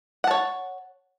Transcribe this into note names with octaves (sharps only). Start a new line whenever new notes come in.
C#5 F#5 A5